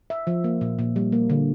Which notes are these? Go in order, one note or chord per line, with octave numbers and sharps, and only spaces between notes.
E5
F3
A#3
A#2
A#2
G3
A#3
D3